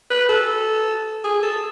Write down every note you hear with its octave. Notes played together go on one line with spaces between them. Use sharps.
B4
A4
G#4
A4